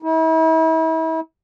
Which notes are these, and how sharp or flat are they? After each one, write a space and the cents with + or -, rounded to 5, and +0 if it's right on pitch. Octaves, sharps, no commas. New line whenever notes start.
E4 -40